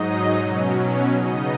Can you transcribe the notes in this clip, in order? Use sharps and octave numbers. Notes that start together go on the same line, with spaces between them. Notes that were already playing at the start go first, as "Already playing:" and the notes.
Already playing: G#2 F#3 D#4 D#5
B2 F#3 C#4
C#3 B3 D#4 D#5